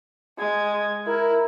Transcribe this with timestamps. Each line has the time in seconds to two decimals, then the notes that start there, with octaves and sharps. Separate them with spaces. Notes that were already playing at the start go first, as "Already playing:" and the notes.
0.38 G#3 G#6
1.07 E4 A#4